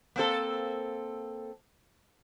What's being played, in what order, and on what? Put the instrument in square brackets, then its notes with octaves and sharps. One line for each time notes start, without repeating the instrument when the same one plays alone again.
[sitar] A#3 C4 A4